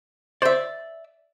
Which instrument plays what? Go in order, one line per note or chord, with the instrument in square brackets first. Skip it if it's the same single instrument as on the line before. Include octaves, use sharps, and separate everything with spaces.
[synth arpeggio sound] C5 [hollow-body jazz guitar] D5 E5